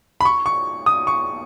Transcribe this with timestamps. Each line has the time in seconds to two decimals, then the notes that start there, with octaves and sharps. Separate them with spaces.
0.21 B5
0.25 C#6
0.46 C#6
0.86 D#6
1.07 C#6